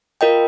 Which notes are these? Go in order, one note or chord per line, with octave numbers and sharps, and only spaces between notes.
F4 A#4 D#5 G5